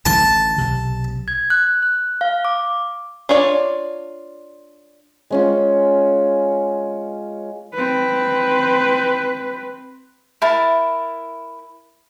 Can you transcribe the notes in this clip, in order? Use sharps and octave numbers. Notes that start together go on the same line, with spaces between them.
A1 D3 E3 A5
B1 C3
G#6
F#6
F#6
F5
D6
D4 F4 C#5 D5
G#3 C#4 F4
C4 B4
E4 A#4 A5